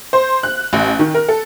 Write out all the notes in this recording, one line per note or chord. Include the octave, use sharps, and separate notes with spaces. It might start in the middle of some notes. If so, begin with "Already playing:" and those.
C5
F#6
A1
D#3
A#4
A4